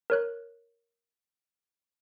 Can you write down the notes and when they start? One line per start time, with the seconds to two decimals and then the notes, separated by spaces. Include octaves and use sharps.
0.10 A#4 C#5 F#6